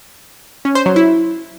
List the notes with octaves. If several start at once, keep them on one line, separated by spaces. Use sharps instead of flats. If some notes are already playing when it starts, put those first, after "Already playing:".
C#4
C5
F#3
E4